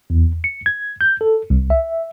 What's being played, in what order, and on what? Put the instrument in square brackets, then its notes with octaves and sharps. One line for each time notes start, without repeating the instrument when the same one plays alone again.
[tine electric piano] E2
C#7
G#6
G6
A4
C2
E5